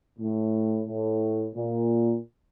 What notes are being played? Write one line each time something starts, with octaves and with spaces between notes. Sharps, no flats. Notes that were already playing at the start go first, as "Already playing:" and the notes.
A2
A2
A#2